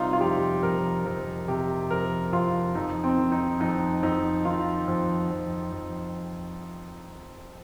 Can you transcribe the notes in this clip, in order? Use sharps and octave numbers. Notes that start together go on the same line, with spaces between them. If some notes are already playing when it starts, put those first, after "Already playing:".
Already playing: C3 G3 D#4 F4
F4
F2 G4
F2 A#4
F2 A#4
C3 G4
F2 A#4
F2 F4
F2 D#4
C4
D#3
D#4
F2 D#4
F2 D#4
D#3 F4
F2
F2
F2